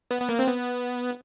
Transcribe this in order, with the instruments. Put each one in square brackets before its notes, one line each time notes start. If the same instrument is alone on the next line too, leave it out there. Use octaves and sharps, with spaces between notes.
[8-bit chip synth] B3
B3
A#3
C4
B3